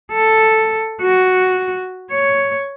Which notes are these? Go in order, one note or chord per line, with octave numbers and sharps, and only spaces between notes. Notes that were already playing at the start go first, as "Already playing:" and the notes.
A4
F#4
C#5